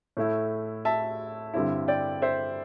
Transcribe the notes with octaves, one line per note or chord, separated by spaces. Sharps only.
A2 A3 E4
E5 A5
G2 D3 G3 C4 E4
D5 G5
C5 E5